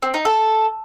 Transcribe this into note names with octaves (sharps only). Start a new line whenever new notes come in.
C4
D#4
A4